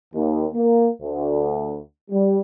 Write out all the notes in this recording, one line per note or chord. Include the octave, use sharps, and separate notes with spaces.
D#2
A#3
D2
G3